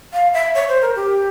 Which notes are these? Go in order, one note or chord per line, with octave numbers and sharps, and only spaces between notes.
F5
E5
C#5
C5
A#4
G4